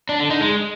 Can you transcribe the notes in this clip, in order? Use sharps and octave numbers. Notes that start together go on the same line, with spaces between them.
D4
D3
D#4
G#3